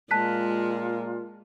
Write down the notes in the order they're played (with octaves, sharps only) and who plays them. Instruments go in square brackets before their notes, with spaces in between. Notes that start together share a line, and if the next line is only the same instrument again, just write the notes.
[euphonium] A#2 [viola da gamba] G#3 [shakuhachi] F4 [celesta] A5 F#6 B6